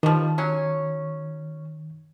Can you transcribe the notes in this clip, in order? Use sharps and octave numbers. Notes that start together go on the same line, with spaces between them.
D#3 F3 G3
F#3 C#4